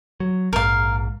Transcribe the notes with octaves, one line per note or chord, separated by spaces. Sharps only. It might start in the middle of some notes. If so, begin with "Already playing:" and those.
F#3
A#1 G#2 A#4 F5